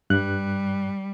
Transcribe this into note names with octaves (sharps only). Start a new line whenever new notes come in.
G2 G3 F#6